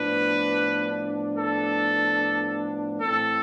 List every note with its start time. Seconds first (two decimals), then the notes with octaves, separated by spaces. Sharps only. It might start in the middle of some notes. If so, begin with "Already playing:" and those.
Already playing: A2 F3 B3 D4 B4
1.38 A4
3.00 A2 E3 A3 C4 A4